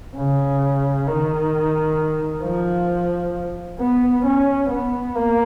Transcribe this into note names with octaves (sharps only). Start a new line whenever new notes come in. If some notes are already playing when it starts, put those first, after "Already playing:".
C#3
D#3
F3
B3
C#4
B3
A#3